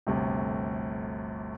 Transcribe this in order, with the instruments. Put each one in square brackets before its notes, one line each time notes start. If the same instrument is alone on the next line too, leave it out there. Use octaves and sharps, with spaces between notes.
[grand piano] G1 D2 C3